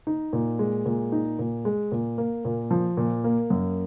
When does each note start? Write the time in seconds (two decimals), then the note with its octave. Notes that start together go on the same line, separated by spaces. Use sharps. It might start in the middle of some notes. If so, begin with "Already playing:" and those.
0.07 D#4
0.33 A#2
0.59 G#3
0.86 A#2
1.12 D#4
1.39 A#2
1.65 G#3
1.92 A#2
2.18 A#3
2.45 A#2
2.71 F3
2.97 A#2
3.24 A#3
3.50 F#2